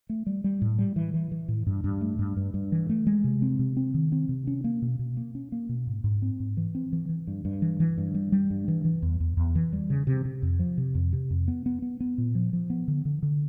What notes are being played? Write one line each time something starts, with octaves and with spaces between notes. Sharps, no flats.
A3
G3
G3
A2
G3
E3
E3
E3
A2
G2
G2
A3
G2
G2
G2
E3
A3
G#3
C3
C4
C3
C4
D#3
C4
C3
C#4
A#3
B2
B2
A#3
C#4
A#3
B2
G#2
G#2
C4
G#2
E3
C4
E3
E3
G2
G2
E3
E3
G2
G3
G3
G2
E3
E3
E2
E2
E2
E3
G3
C#3
C3
C3
F2
F3
C3
F2
C3
F2
B3
B3
B3
B3
A#2
F3
F3
B3
D3
D3
D3